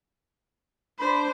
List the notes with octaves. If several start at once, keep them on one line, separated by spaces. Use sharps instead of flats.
D4 C5 B5